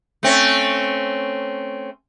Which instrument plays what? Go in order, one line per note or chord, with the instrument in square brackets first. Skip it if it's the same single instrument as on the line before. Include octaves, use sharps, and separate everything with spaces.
[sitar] A3 C4 C#4